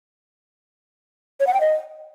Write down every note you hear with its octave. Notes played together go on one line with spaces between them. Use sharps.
C#5
F#5
G5
D#5